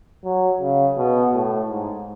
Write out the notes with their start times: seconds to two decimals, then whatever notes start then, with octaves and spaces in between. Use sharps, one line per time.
0.24 F#3
0.61 C#3
0.98 B2
1.34 A2
1.70 G#2